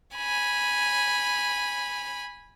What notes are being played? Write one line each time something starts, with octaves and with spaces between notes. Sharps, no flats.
G#5 B5